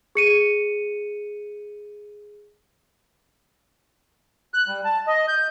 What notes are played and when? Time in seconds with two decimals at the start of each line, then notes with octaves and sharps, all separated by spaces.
0.15 G#4 C#7 D#7
4.54 F#6
4.68 G3
4.84 A5
5.07 D#5
5.28 G6